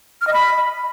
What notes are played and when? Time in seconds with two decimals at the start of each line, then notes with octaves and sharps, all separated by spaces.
0.21 F6
0.27 D#5
0.33 B5